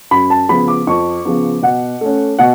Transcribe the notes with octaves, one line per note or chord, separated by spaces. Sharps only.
F#2 B5
A5
C#3 F3 B3 B5
D6
F2 C#6
C#3 F3 B3
B2 F#5
A3 C#4
B2 F#5